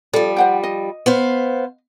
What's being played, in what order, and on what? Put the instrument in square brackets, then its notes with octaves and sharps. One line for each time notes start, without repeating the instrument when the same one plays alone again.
[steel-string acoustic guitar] F3 G3 [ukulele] A4
[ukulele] C5 F#5 G5
D#5
[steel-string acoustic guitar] B3 C5 F5